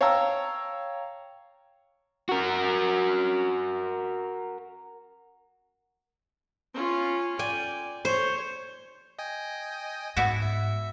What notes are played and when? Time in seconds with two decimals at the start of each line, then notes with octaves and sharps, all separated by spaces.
0.01 C#5 F5 G5 A5 A#5 E6
2.29 F#4 A#4
6.74 C#4 F4
7.39 D5 G5 G#5
8.05 C5 C#5
9.19 D#5 G5 G#5
10.16 G#2 B3 E4 F#4
10.42 E5